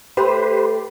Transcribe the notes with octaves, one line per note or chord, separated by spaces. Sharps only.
A3 G4 A4 B4 C5